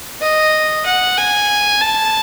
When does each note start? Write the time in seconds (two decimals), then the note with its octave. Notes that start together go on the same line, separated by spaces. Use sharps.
0.22 D#5
0.86 F#5
1.18 G#5
1.81 A5